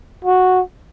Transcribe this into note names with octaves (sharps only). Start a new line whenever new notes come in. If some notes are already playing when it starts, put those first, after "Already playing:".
F#4